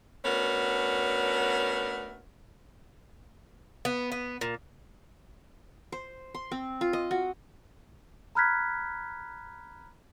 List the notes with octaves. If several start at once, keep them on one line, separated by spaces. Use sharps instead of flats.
A3 B3 C#4 D4 F#4 A#4
B3
B3
A#2
C5
C6
C4
F4
D#5
F#4
A#5 B5 F6 F#6 G#6 B6